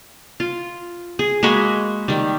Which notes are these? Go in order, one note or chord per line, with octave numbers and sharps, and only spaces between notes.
F4
G#4
G#3 A#3 F#4 B5
D#3 G3